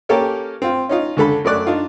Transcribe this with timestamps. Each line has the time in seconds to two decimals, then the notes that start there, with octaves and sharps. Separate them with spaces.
0.09 A#3 C#4 G4 A4 A#4 C#5
0.62 C4 F4
0.89 C#4 D#4 F4
1.17 C#2 D3 A4 B5
1.45 F#2 A3 D5 F#6
1.67 D4 D#4 F4